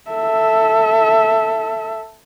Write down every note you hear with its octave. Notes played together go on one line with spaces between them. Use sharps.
A4 E5